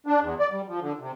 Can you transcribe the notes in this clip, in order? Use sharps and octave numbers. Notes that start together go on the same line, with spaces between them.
D4
E2
D5
G3
F3
D3
C3